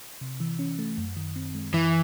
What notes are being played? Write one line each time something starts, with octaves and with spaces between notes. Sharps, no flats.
C3
E3
C#4
A3
F#2
D#3
C4
G#3
F#2 E3